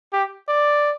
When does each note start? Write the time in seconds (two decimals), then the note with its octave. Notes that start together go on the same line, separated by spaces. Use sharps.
0.13 G4
0.49 D5